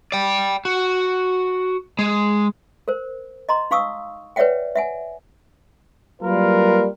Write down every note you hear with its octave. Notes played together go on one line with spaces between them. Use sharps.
D5 G5
F#4
G#3
A#4 C5
D#5 A#5 C6
D#4 F5 C#6 D#6 E6
B4 C#5 D5 E5 F#5 G5
E5 F#5 G#5
F#3 G3 A#3 F4 A#4 B4